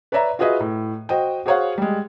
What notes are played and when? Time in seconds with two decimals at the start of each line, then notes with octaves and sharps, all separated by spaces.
0.12 B4 C#5 D5 E5 A#5
0.39 F4 F#4 G#4 B4 D#5 E5
0.60 A2
1.09 F#4 C5 D#5 G5
1.46 F#4 G#4 C5 C#5 F5 F#5
1.78 G3 G#3